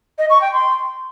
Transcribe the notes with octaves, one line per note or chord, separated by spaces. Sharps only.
D#5
C#6
G5
C6